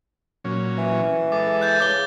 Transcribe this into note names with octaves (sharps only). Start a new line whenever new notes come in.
A#2 F#3 C#4
E3
G#3 A4 D6
F#6 G6 A6
C#3 D6 G7